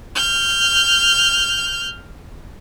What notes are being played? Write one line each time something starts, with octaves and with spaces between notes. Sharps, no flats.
F6 G6